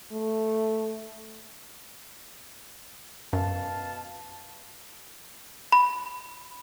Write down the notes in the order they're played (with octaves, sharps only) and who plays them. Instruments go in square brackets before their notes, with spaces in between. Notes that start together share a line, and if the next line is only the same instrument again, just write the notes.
[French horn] A3
[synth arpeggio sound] F#2 [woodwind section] B2 F5 A5
[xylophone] B5